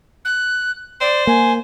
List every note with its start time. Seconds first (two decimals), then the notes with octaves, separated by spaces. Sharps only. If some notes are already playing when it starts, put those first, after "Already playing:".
0.25 F#6
1.01 C5 D5
1.27 A#3 G#5